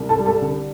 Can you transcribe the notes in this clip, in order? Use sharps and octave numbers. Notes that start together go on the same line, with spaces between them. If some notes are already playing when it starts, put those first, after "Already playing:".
Already playing: C2
A4 A5
G3
A4 A5
D3